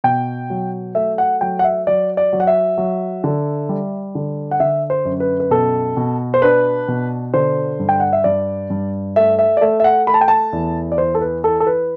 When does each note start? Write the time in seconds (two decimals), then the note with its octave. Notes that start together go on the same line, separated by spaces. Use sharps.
0.04 B2 G5
0.50 F#3
0.95 A3 E5
1.18 F#5
1.41 F#3 G5
1.59 F#5
1.64 E5
1.87 F#3 D5
2.17 D5
2.33 F#3
2.40 F#5
2.47 E5
2.78 F#3
3.24 D3
3.69 G3
4.15 D3
4.51 F#5
4.60 D3 E5
4.90 C5
5.05 F#2
5.20 B4
5.40 B4
5.51 B2 A4
5.97 B2
6.34 C5
6.42 D4 B4
6.88 B2
7.34 D3 C5
7.80 G2
7.89 G5
8.00 F#5
8.13 E5
8.24 G2 D5
8.70 G2
9.16 A3 E5
9.39 E5
9.57 D5
9.61 A3 E5
9.80 E5
9.84 F#5
10.07 A3 B5
10.14 A5
10.21 G5
10.28 A5
10.53 E2
10.92 D5
10.98 E3 C5
11.15 A4
11.21 B4
11.44 E3 A4
11.60 A4
11.67 B4